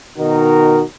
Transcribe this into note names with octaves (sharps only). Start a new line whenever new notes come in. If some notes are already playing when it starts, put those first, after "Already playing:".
B2 D#3 D#4 F#4 A#4